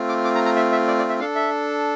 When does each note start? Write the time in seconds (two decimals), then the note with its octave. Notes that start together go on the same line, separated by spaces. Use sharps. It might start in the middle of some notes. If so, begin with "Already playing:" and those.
Already playing: A3 C4 F4
0.09 D6
0.24 D6
0.35 A#5
0.45 A#5
0.56 E5
0.72 E5
0.87 D5
0.99 D5
1.09 E5
1.20 D4 A4 F5
1.35 E5